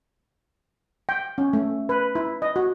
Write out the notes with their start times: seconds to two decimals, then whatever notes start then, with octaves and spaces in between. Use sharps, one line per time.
1.09 G5
1.38 C#4
1.53 A3
1.89 B4
2.15 E4
2.42 D#5
2.56 F#4